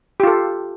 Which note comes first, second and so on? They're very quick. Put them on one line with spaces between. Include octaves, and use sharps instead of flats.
G4 F4 A4